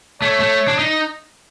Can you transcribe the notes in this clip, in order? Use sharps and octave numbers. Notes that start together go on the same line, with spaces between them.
A3 C#5
A3
D4
D#4